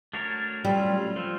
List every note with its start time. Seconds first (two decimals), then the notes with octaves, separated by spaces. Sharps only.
0.14 A3 D4 F#4 A#4 C#5
0.65 F#3 G3 A3 C#4 F4
1.16 F3 A3 C4 F4 A4